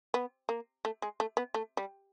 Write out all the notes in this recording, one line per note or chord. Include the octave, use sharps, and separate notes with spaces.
B3
A#3
A3
G#3
A3
B3
A3
G3